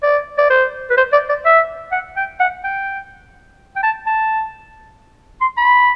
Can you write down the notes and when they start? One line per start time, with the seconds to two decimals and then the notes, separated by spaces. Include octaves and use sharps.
0.03 D5
0.38 D5
0.50 C5
0.90 B4
0.97 C5
1.13 D5
1.29 D5
1.45 E5
1.92 F#5
2.17 G5
2.40 F#5
2.64 G5
3.76 G5
3.83 A5
4.07 A5
5.41 C6
5.57 B5